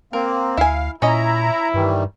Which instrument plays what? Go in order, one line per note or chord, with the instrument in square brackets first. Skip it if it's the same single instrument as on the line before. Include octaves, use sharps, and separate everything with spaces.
[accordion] A#3 C4 [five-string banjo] A#4
[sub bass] D2 [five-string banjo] E4 G#5 [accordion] F5
[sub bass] A#2 [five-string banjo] C#4 D#5 [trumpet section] E4 [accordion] A#5
[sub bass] G2 [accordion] D#3 E3 G3